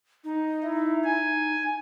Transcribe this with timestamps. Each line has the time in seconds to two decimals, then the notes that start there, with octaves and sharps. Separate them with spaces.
0.24 D#4
0.63 E4
1.04 G#5